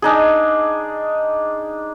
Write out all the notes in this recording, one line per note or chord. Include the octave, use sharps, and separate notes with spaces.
D4 D#4 G#4